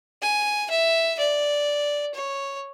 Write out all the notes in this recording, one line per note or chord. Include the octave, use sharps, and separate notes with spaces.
G#5
E5
D5
C#5